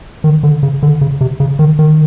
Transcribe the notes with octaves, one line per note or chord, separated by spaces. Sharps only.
D#3
D3
C#3
D3
C#3
C3
C#3
D#3
D#3